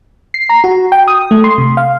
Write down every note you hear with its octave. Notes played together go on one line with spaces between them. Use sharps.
C7
A#5
F#4
G5
D#6
A3
C6
C3
F5